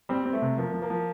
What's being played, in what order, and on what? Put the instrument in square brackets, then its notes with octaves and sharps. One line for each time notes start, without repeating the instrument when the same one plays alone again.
[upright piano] G3 [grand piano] C4
[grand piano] C4
[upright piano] A3
[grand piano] C3
[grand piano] F3 [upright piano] A#3
[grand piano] F3
[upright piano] A#3
[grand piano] F3